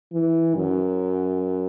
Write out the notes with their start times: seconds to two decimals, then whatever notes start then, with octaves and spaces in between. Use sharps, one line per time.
0.13 E3
0.56 F#2